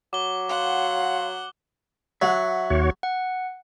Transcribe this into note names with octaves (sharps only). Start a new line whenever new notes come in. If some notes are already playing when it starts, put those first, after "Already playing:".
F#3 D6 G7
F5 F#5 C6
F#3 E5 F#5
D#2 F#4 C#5
F#5